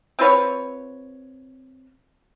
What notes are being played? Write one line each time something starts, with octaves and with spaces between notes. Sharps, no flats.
C4 F4 B4 C#5